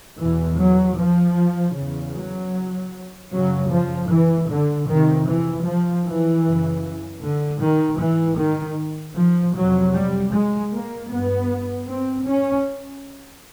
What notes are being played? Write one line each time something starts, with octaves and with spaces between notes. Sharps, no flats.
E2 B2 E3
F#3
F3
E2 C#3
F#3
F#2 C#3 F#3
F3
E3
D3
F2 C3 D#3
E3
F3
E3
F#2 C#3
D3
D#3
G#2 E3
D#3
F3
F2 C3 F#3
G3
G#3
A#3
G2 B3
C4
C#4